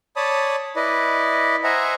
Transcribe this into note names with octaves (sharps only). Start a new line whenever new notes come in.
C#5 D5 A5 B5 D#6
E4 B4 D5 D#5
C5 D#5 E5 F#5 G#5 A#5